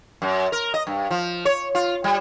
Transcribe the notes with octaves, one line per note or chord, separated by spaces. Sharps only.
F#2
A#4
D#5
G2
F3
C#5
F4
G3